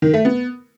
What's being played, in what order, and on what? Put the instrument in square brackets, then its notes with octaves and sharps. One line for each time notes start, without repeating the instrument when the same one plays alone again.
[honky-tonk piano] D#3
A3
B3